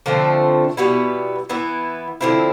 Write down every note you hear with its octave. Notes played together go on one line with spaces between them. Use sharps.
D3 F3 A3 C4
B2 G3 B3 E4
E3 B3 E4
D3 F3 C4 E4